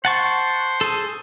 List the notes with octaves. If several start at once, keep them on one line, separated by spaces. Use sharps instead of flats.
C5 F#5 A5 C#6
G#4 A4